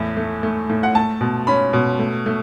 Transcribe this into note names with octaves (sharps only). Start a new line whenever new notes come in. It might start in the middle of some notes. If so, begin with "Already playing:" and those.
Already playing: E2 A2
A3
A3
A2
F#5
A3 A5
B2
C#4 B5
B2
A3
A3